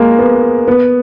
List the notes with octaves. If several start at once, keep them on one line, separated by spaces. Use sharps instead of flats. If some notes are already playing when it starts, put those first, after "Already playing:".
Already playing: G#3 A#3
B3
B3